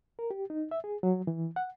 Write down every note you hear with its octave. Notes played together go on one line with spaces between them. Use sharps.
A#4
G4
D#4
E5
G#4
F#3
E3
F#5